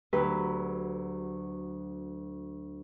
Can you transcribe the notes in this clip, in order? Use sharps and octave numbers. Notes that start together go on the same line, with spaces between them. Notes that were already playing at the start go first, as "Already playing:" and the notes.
D2 F#3 G4 B4